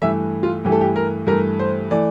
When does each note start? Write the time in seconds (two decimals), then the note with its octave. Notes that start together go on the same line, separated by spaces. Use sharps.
0.02 G2 E3 A3 E5
0.43 F4
0.65 G2 E3 A3 G4
0.72 A4
0.81 G4
0.96 A#4
1.27 G2 E3 A3 A#4
1.59 C5
1.91 E3 A3 D5